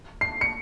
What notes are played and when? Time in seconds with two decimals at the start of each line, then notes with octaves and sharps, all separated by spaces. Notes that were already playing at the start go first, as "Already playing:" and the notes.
0.21 C7
0.41 C#7